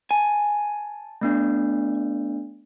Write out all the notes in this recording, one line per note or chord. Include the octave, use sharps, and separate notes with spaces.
G#5 A5
A3 B3 D4